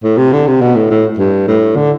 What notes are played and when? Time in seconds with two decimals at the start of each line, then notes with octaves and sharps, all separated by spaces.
0.04 A2
0.18 C3
0.33 D3
0.47 C3
0.61 B2
0.75 A2
0.91 A2
1.19 G2
1.48 A2
1.76 D3